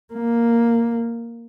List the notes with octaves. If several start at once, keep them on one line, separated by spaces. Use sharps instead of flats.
A#3